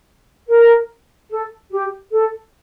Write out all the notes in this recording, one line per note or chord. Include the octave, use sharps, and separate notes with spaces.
A#4
A4
G4
A4